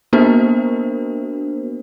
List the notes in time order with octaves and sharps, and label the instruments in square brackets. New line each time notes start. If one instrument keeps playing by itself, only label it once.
[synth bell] A#3 B3 D4 F#4 A#4 C5